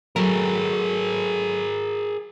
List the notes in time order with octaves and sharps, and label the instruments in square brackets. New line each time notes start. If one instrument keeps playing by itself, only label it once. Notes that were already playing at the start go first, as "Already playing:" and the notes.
[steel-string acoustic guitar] F#3 A3 [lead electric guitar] G#4 A#4